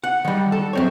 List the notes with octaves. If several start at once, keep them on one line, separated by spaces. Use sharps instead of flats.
F#5
D#3 G3
A4
F#2 C4 C#5